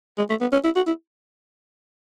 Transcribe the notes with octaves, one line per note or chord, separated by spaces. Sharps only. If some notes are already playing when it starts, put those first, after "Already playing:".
G#3
A3
B3
C#4
E4
F#4
E4